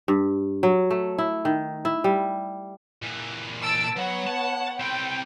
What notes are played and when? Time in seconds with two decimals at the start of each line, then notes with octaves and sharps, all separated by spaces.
0.08 G2
0.63 F#3
0.90 A3
1.18 E4
1.45 D#3
1.85 E4
2.04 G3
3.02 A#2 E3
3.62 A5 E6 D7
3.96 F#3 B3 C#5 F#5
4.27 A5
4.80 C4 E4 G5